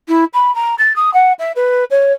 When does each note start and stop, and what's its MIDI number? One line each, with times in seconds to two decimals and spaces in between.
0.08 0.24 64
0.33 0.53 83
0.55 0.75 82
0.78 0.95 93
0.96 1.12 87
1.13 1.32 78
1.39 1.52 76
1.56 1.84 71
1.90 2.12 73